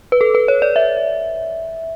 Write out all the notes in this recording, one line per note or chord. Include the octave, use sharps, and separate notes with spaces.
B4
A4
B4
C#5
D5
E5